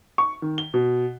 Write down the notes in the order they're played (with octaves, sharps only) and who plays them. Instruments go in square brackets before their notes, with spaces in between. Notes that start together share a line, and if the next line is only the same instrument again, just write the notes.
[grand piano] C#6
D#3
G7
B2